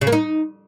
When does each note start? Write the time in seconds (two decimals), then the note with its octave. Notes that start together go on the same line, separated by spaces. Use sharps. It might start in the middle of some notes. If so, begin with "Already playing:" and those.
0.01 C#3
0.07 A#3
0.12 D#4